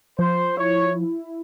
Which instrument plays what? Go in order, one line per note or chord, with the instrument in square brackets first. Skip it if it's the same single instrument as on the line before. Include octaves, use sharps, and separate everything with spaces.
[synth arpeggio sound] F3 [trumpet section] C5
[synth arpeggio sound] E4 [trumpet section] C#5